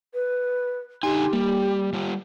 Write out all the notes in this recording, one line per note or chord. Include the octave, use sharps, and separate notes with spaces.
B4
D3 D#4 G4 G#5 C6
G3 A#3
G3 F4